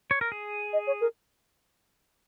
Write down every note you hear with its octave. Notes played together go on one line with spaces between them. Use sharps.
C#5
A#4
G#4
D#5
C#5
A#4